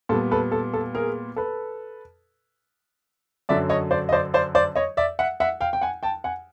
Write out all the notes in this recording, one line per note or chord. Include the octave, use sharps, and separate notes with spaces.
A#2 G3 B3 A4
A4 B4
A4
A4
G#4 A#4
A4 B4
F#2 D3 F#3 D5 E5
C#5 D#5
C5 D5
D#5
C5 D5
C5 D5
C5 D5
C#5 D#5
D5 E5
E5 F#5
E5 F#5
F5 G5
G5
F#5 G#5
G5 A5
F#5 G#5